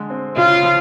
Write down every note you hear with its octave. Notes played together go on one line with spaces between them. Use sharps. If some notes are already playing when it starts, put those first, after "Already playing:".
Already playing: D3 G#3
C4
C#3 F4
F3